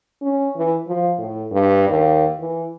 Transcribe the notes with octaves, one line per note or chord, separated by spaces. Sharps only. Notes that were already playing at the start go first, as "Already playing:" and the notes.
C#4
E3
F3
A2
G2
D#2
E3